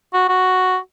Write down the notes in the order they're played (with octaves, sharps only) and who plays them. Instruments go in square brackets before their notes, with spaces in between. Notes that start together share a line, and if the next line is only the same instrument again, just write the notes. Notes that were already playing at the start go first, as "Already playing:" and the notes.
[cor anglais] F#4
F#4